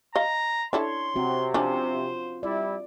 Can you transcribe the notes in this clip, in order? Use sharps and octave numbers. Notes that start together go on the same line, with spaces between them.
D#5 F5 A#5
D4 E4 A4 C#5 C6
C3 C4 F#4
F3 C#4 D4 F4 C5
G3 E4 D5